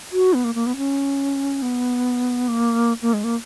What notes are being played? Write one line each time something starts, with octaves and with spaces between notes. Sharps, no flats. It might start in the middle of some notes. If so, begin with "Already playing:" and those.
F#4
B3
A#3
A#3
B3
C#4
B3
A#3
A#3
G#3
A#3